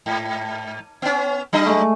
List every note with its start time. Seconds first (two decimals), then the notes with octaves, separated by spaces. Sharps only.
0.06 G#2
1.02 B3 C#4
1.53 F#3 D4 D#5
1.66 G#3 A3